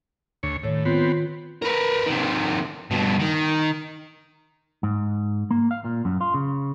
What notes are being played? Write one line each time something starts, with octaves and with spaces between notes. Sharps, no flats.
D2 C#5
A2 D#3 C#5
B3 C4 F4
A#4 B4
C3 D#3
G2 B2
D#3
G#2
A#3
F5
A#2
F#2
F4
C#3